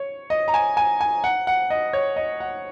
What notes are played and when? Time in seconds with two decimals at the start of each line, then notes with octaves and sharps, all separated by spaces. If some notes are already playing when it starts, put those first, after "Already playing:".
Already playing: C#5
0.30 D#5
0.48 A#5
0.54 G#5
0.77 G#5
1.01 G#5
1.24 F#5
1.47 F#5
1.70 D#5
1.93 C#5
2.16 D#5
2.40 F#5